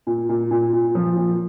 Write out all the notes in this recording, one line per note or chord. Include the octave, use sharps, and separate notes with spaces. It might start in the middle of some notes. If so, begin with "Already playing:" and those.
A#2
A#2
A#2
A#2
F3
A#2